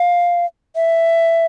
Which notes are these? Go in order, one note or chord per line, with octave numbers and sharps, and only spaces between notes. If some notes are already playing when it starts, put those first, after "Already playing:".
Already playing: F5
E5